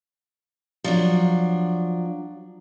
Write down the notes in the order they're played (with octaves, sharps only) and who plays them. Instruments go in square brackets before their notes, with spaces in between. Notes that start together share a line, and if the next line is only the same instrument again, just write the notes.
[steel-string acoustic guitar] F3 F#3 D4